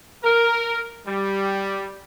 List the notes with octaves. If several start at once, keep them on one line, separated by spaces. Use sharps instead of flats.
A#4
G3